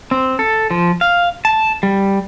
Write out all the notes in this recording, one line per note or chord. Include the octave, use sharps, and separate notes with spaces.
C4
A4
F3
F5
A5
G3